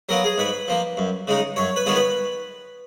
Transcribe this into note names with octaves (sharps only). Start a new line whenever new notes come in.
F#3 B3 F4 A#4
G#4
G#2 B4
F3 A#3
F#2
C#3 G#3 D#4
F#2 C#5
B4
D#3 G#3 B3 F4 C#5
B4